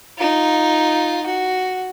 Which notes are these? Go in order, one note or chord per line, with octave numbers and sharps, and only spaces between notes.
D#4 F4
F#4